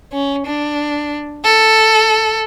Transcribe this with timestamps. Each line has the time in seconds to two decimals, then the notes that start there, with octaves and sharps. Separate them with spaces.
0.13 C#4
0.46 D4
1.44 A4